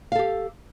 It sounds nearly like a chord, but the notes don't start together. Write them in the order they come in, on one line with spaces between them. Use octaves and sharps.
F5 A4 G4